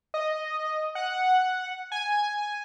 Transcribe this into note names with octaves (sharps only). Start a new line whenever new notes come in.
D#5
F#5
G#5